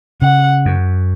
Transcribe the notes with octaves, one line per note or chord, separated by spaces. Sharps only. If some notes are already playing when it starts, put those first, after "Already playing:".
C#3 F#5
F#2